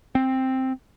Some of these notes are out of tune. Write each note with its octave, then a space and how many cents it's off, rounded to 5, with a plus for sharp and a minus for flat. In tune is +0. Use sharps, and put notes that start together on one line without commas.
C4 +5